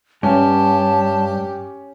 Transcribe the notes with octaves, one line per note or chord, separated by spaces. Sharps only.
G2 C#4 G4 A5